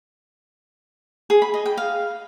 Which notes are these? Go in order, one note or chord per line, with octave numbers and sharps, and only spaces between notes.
G#4
B5
D#5
G5
F5